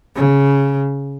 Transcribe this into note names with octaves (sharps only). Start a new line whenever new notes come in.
C#3